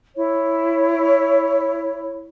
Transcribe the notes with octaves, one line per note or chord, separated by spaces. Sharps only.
E4 C#5